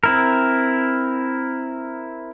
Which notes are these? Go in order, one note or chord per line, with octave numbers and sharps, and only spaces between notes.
C4 E4 A#4